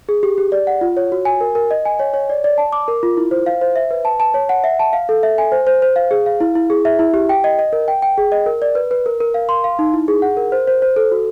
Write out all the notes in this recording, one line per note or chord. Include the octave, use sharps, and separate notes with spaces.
G#4
G4
G4
D5
F#5
F4
C#5
F#4
G#5
A#4
A#4
D#5
G#5
C#5
C#5
D5
D5
A5
D6
A#4
F4
E4
C5
F5
C5
E5
B4
A5
A5
C#5
F#5
E5
A5
F5
A4
E5
G#5
C5
C5
C5
F5
G#4
F5
E4
E4
G#4
E5
E4
G4
G5
D#5
D#5
A#4
G5
G5
G#4
D#5
A#4
D5
B4
B4
A#4
A#4
F5
C6
F5
D#4
E4
G#4
F#5
A#4
C5
C5
C5
A4
F#4